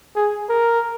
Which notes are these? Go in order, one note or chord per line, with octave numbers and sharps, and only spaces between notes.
G#4
A#4